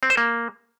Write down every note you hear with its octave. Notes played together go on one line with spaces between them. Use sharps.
C4
C5
A#3